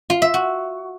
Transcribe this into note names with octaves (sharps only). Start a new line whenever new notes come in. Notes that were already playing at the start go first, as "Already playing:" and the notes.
F4
E5
F#4